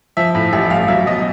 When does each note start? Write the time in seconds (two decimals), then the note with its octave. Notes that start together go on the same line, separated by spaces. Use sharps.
0.17 F3 E5
0.35 A2
0.53 A1 E5
0.70 A1 F5
0.88 F#3 E5
1.06 B2 D#5